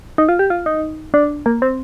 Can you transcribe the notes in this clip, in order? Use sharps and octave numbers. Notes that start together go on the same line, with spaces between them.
D#4
F4
G4
F4
D#4
D4
A#3
C4